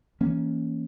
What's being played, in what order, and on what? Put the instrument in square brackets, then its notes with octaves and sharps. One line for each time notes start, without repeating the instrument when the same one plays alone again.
[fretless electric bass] E3 A#3 C#4